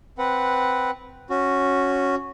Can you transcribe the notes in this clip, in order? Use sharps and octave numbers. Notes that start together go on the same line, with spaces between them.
C4 B4 F#5
C#4 F#4